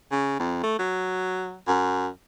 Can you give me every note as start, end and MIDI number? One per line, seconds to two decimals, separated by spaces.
0.12 0.36 49
0.40 0.62 41
0.63 0.74 57
0.79 1.57 54
1.67 2.07 42